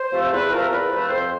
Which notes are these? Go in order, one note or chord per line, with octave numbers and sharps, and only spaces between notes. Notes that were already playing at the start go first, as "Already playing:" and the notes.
Already playing: C5
C3 F3 A3
E2 B4
C3 F3 A3 A#4
E2 B4
C3 F3 A3
F2 C5